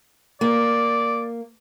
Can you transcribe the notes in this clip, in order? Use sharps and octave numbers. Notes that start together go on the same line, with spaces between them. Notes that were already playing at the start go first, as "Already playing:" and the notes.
A#3 D5